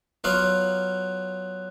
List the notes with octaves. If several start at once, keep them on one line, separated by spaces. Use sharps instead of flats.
F#3 B3 F4 B4 F5